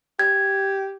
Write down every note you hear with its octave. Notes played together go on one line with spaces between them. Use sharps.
G4 G#6